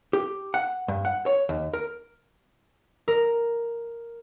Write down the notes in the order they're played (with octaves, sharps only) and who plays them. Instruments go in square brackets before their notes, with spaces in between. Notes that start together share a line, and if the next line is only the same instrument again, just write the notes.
[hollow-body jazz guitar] G4
F#5
G2
F#5
C#5
D#2
A#4
[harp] A#4